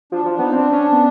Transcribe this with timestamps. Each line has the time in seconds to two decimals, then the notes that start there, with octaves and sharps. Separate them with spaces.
0.12 F3 D4
0.25 F3
0.32 D4
0.39 B3 D#4
0.53 C4 D4
0.73 C#4
0.92 B3